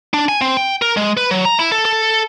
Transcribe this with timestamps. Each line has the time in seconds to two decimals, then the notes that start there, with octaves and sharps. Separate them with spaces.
0.14 D4
0.29 G#5
0.41 C4
0.57 G5
0.82 A#4
0.97 G#3
1.17 B4
1.31 F#3
1.45 A#5
1.59 E4
1.72 A4
1.85 A4